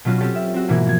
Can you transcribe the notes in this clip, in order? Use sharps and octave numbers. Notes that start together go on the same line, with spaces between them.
B2 F#3 C#4 F4 F#4
C4 C#4 G4 A4
E5
C4 F#4
G#2 B2 E3 A#3 E4
F3 G#6